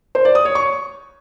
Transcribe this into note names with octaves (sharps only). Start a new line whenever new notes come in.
C5
D5
D#6
C#5
C#6